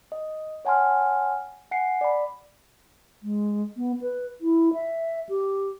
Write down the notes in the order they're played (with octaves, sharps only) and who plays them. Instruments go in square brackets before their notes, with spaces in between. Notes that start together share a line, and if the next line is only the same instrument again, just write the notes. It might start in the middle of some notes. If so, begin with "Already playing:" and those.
[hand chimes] D#5
C#5 F#5 G#5 A5 C6 F6
F#5 G#5 C7 C#7
D5 B5
[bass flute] G#3
B3
B4
E4
E5
G4